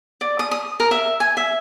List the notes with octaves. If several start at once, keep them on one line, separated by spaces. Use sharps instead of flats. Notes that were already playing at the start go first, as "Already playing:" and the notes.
D5
D#6
D#6
A#4
E5
G#5
E5